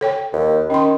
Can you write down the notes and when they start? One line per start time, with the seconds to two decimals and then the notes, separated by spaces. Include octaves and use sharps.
0.01 A4 C#5 G5
0.33 D#2
0.70 D#3 C#4 C6